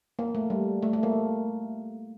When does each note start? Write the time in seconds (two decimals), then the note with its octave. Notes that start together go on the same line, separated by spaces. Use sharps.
0.19 A#3
0.35 A3
0.50 G3
0.83 A3
0.93 A3
1.03 A#3